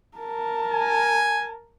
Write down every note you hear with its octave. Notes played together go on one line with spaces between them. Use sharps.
A#4 A5
G#5